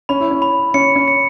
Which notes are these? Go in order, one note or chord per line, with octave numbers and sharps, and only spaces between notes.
C#4 B5
E4
C#4
B5
C#4 C#7
C#4
C#7